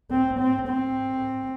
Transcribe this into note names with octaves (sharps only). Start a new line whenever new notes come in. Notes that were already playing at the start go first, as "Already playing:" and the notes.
C4
C4
C4